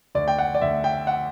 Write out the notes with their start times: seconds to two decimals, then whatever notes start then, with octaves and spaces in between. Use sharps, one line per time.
0.15 D2 D5
0.28 G5
0.39 F#5
0.55 D5
0.61 D2 E5
0.84 G5
1.07 F#5